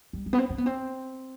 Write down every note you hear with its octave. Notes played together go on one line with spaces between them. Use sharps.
G3
G#3
B3
C4
C4
B3
C4